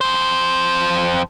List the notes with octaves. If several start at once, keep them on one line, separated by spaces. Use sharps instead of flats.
F2 C5